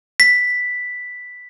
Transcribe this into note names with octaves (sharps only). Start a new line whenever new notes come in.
B6